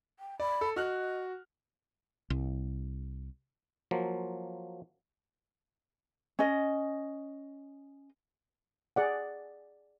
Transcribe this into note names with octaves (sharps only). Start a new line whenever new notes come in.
G5
D5 B5
A4
F#4 D#5 F6 F#6
C2
F3 F#3 A#3
C#4 D#5
G#4 D5 F#5